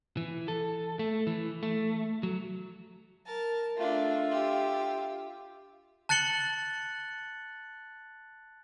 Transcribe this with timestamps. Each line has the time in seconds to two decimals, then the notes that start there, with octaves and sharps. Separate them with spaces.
0.17 E3
0.48 A4
0.99 A3
1.27 E3
1.63 A3
2.23 F#3
3.26 A#4 A5
3.77 A3 D4 F4 E5
4.31 G4
6.09 A5 F#6 A6 C#7 F#7 G7